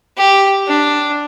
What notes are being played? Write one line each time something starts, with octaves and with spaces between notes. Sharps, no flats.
G4
D4